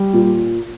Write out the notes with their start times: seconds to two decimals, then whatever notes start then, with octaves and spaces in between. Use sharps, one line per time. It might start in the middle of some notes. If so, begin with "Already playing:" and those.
Already playing: G3
0.13 A#2